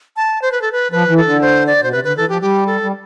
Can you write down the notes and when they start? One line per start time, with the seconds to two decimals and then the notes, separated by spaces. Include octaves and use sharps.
0.16 A5
0.42 C5
0.52 B4
0.62 A4
0.72 B4
0.91 F3 B4
1.08 E3
1.17 A4
1.25 D3
1.41 C5
1.67 D5
1.81 B2 C5
1.91 C3 B4
2.03 D3 B4
2.16 E3 A4
2.29 F3 G4
2.42 G3 G4
2.67 A4
2.82 G3